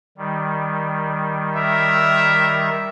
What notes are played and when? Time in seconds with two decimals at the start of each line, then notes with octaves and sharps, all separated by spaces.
0.18 D#3 G3
1.56 A#4 E5